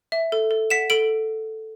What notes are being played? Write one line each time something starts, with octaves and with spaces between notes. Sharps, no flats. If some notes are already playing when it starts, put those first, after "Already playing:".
E5
A4
A4
F#5 B6 E7
A4 D7 F#7